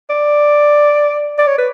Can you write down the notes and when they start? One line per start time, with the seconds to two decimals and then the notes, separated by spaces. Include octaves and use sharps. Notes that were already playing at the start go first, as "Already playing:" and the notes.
0.10 D5
1.38 D5
1.47 C#5
1.58 B4